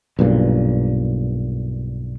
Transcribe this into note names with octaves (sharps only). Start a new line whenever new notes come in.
B1 G2 A#2